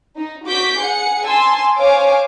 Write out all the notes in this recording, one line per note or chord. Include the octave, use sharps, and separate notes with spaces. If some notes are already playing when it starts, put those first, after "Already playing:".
D#4
F#4 D6 G6 B6
G#4 F#5 C#7
G#5 A5 C6 E6
C5 C#5 F5 G#5 D6